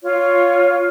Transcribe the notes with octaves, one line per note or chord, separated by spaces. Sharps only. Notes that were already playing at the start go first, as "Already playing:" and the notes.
F4 C#5